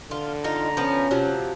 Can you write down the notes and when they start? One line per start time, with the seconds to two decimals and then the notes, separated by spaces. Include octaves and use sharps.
0.11 D3 F4
0.44 D#4 F4 A#5
0.77 F3 B3 C#4
1.11 C3 F3 F#3